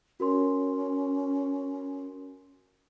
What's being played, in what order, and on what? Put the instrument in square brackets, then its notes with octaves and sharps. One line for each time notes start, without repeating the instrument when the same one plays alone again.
[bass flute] C#4 [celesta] F#4 A#4 C6